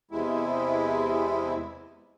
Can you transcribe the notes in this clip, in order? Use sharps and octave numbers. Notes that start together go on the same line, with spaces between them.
E2 C3 G#3 E4